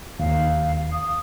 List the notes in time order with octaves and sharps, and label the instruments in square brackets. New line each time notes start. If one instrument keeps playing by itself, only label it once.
[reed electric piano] D#2 [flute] F5
[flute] D#6